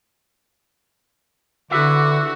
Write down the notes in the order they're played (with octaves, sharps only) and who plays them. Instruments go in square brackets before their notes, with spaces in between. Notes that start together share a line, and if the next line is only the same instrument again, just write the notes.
[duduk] D3 [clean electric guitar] E4 B4 E5 [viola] F#4 [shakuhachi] D6